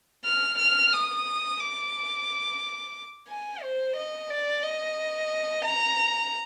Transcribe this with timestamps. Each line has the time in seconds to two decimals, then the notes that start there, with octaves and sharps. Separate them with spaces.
0.25 F6
0.58 F6
0.92 D#6
1.60 D6
3.29 G#5
3.63 C5
3.96 D#5
4.30 D5
4.63 D#5
5.65 A#5